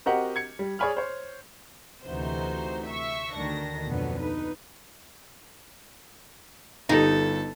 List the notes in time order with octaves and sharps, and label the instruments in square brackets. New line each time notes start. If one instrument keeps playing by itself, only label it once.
[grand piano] C4 F#4 G4 A#4 D#5 F#5
G#6 C#7
G3
G#4 C#5 D5 G#5 B5 F6
C5 C#5
[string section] D2 C3 E3 D#4 F#4 C5
E5 C#6 E6
D2 D#3 D4 A#6
F2 B2 D3 F#3 B3
D#4 B4
[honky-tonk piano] G1 G4 [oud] D#4 [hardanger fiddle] A4